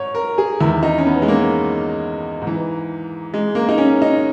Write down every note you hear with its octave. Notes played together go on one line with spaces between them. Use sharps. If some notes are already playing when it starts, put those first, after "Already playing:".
Already playing: G#2 C#5
A#4
G#4
E2 D#3 E4
D#4
C#4
B3
G#3
A#3
G#2
E3
G#3
A#3
D#4
C#4
D#4